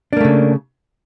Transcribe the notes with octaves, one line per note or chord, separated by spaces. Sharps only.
C#3 A3 A#3 D4